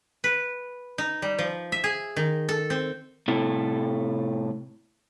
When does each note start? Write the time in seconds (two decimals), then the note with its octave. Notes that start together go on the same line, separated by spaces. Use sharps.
0.24 B4
0.98 D#4
1.22 G3
1.39 F3
1.72 E5
1.84 G#4
2.16 D#3
2.49 A4
2.70 C4
3.28 A2 C3 E4 A4